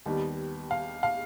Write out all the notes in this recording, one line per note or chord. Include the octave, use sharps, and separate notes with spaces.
D#2 D#3 G3 B3
F5
F5